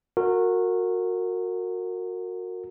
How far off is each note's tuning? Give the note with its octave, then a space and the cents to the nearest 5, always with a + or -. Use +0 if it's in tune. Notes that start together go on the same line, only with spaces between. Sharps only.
F#4 -20 A#4 -25